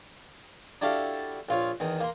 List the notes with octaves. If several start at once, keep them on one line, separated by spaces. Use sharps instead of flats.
D4 E4 F#4 G4 A4 F5
A#1 F4 C#5 F5
E2 D#3
A#3 C6